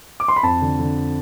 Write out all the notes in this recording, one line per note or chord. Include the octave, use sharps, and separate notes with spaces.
D6
C6
B5
F2 A5
D3
D3